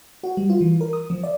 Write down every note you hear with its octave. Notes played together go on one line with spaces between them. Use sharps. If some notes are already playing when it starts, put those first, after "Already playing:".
F#4
G3
F4
E3
A#4
D#6
F3
D5